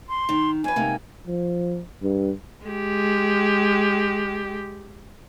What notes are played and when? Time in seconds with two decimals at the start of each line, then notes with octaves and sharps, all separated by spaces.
0.09 C6
0.29 D#3
0.64 F2 B4 G#5
0.76 G#2 C3 A#3
1.27 F3
2.03 G2
2.67 G#3 G4